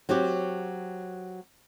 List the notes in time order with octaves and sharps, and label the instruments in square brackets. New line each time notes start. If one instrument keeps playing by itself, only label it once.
[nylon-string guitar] F#3 C4 F#4 G4